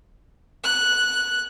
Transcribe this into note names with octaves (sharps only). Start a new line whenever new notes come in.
F#6